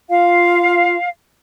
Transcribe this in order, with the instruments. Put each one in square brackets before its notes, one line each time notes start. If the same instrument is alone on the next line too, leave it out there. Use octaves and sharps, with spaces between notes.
[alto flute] F4 [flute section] F5